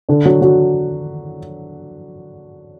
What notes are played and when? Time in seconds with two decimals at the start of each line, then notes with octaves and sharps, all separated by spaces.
0.09 D3 D4
0.25 F#3 F#4
0.41 F#3 F#4